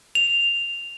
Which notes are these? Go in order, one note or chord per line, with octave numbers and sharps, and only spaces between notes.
F7